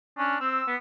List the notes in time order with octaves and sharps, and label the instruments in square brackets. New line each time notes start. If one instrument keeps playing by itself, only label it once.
[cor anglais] C#4 [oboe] D4
[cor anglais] C4 [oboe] E6
[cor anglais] B3